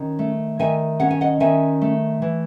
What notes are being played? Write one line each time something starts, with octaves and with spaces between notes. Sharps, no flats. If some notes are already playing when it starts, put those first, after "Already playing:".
Already playing: D#3 C#4
A3
D#3 E5 G#5
C#4 F#5
G#5
D#5 F#5
D#3 E5 G#5
A3
E3